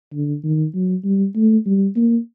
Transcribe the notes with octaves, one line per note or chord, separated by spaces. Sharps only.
D3
D#3
F#3
G3
A3
G3
A#3